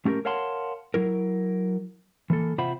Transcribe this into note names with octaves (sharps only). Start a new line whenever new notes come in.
A3 C#4 G4 A4 A#4
A#4 C#5 F5 F#5 A5 C6
F#3 E4 A#4
E3 A#3 A4
C3 F4 C5 E5 F#5 B5